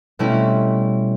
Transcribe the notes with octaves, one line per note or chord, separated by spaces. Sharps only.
B2 G3 A3 C4 C#4 E4